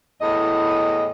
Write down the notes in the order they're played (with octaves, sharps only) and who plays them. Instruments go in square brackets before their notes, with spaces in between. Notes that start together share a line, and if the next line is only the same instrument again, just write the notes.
[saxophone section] E2 A2 D#5